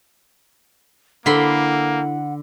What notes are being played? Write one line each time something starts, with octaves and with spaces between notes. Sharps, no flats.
D3 A#3 E4 A4 C5 F#5 B5 C6